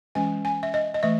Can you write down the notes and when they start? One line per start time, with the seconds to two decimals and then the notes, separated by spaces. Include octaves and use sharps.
0.15 E3 G#3 C#4 G#5
0.45 G#5
0.63 E5
0.74 D#5
0.94 D#5
1.03 E3 A3 E5